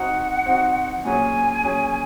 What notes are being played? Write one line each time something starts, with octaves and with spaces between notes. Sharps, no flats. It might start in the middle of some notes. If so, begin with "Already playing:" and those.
Already playing: C4 D#4 F#4 F#5
C4 D#4 F#4
A#2 F#3 C#4 G#4 C#5 G#5
A#2 F#3 C#4 G#4 C#5